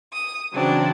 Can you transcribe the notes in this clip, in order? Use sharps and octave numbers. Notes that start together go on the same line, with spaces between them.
D#6
C#3 E3 F#3 C4 D4